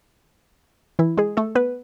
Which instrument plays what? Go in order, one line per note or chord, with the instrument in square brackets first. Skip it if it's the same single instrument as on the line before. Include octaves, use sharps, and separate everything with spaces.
[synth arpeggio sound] E3 E4
G#3 G#4
A3 A4
B3 B4